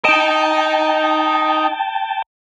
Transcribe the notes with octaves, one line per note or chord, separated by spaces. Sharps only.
D#4 D#5 G5 A5